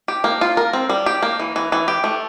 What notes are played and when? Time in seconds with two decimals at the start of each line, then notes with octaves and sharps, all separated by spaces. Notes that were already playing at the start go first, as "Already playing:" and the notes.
0.08 G4
0.24 A#3
0.41 F4
0.57 A#4
0.73 C4
0.90 G3
1.06 G4
1.22 A#3
1.40 E3
1.56 E3
1.72 E3
1.88 G4
2.04 A3